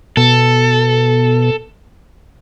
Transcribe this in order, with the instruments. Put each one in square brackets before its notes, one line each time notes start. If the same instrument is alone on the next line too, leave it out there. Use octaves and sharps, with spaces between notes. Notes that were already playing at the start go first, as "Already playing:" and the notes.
[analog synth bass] B2 [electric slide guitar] A4